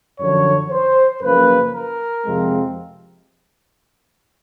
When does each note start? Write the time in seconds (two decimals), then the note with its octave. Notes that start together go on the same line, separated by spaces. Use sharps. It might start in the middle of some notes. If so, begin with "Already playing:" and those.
0.19 F#2 D3 F3 C#5
0.70 C5
1.21 F#2 C#3 F3 A#3 B4
1.73 A#4
2.24 F2 C3 F3 G#3 C4